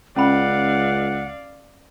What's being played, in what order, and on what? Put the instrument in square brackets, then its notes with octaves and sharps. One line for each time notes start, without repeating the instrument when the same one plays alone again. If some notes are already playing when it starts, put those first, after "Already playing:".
[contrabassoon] C#2 [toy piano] C#4 B5 [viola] D5 F5 [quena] F#5